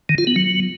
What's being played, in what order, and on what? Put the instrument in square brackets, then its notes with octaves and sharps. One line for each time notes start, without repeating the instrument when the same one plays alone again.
[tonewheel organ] D#3
F4
B3
F#3